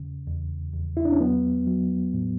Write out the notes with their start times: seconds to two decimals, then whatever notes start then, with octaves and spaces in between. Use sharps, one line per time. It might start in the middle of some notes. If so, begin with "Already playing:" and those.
Already playing: E2 C#3
0.27 E2
0.74 E2
0.97 E4
1.05 D4
1.12 C#4
1.21 F#3 B3
1.67 F#3
2.14 A2